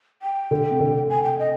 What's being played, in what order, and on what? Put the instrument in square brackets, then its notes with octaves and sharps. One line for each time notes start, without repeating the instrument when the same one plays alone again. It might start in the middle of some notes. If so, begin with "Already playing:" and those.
[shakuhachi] G5
[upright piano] D3
C3
D3
[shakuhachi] G#5
G5
D#5